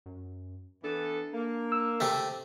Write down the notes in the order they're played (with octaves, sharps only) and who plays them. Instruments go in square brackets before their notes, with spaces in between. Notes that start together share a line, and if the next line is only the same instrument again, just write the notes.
[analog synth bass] F#2
[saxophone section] E3 B3 A4 [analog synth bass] D4
[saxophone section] A#3
[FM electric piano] E6
[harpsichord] C3 A3